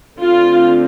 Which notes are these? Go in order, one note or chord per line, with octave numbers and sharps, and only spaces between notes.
D3 A3 C4 F4